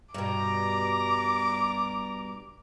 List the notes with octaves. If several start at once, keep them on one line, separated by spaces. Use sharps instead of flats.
G2 B2 D5 A#5 D6